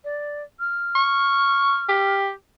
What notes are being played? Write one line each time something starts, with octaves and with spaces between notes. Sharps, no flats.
D5
F6
C#6
G4